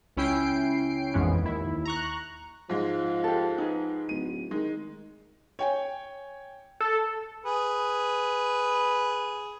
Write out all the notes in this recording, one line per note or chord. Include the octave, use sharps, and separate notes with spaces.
C#2 C#4 E4 G5 C7 D7
A#1 F2 G#2 E3 B3 C#4
D#2 E4
A#5 C#6 F#6
G#2 F3 G#3
G4 A4
D#4 G#4 B4
D1 D#7
D#3 G#3 D#4
C#5 G5 G#5
A4
G#4 B4